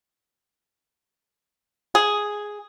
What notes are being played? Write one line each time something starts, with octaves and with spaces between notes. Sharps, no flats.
G#4